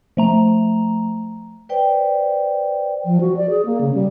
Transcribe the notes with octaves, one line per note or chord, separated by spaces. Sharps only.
F3 A3 A#5
B4 C5 D5 G5
F3
F#4
D5
G#4
A#3
C#3
G3